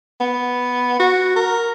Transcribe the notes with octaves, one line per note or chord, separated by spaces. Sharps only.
B3
F#4
A#4